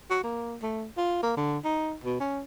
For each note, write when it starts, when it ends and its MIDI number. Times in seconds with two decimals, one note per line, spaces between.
0.10 0.20 66
0.24 0.57 58
0.62 0.85 57
0.97 1.18 65
1.23 1.32 58
1.37 1.59 50
1.65 1.94 63
2.04 2.18 47
2.20 2.42 61